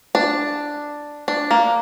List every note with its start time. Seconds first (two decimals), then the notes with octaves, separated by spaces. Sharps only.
0.15 D4
1.28 D4
1.51 A#3